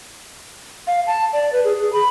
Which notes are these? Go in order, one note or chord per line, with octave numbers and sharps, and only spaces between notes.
F5
A5
D5
B4
G#4
G#4
B5